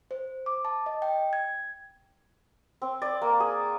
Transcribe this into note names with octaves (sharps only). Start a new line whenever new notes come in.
C5
D6
A5
D#5
G5
G#6
C4
D5
A#3
G#4